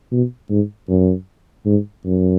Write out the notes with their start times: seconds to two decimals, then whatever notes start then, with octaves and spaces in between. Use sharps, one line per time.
0.12 B2
0.50 G#2
0.89 F#2
1.66 G#2
2.05 F#2